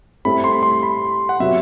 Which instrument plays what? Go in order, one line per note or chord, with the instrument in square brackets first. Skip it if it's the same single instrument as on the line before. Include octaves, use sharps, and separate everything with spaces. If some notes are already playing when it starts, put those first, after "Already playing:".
[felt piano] A2 G3 C4 E4 A4 [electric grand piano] B5
[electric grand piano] C6
C6
B5
F#5
[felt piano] C3 F#3 B3 F#4 [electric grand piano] E5